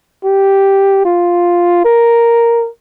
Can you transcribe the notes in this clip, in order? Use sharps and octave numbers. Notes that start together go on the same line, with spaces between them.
G4
F4
A#4